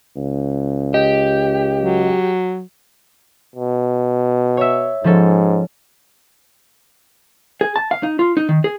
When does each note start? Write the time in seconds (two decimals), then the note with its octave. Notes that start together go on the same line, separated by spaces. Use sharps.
0.16 C#2
0.94 G4 D#5
1.80 F#3
3.56 B2
4.57 C#5 E5
5.04 G#2 F3 C#4 A4
7.61 G#4
7.76 A5
7.91 F5
8.03 D#4
8.19 F4
8.37 D#4
8.49 D#3
8.64 G#4